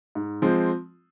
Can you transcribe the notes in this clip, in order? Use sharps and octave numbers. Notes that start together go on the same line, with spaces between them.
G#2
F3 G#3 C4